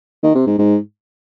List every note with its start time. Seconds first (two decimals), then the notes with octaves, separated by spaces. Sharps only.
0.23 D#3
0.35 C3
0.47 G#2
0.58 G#2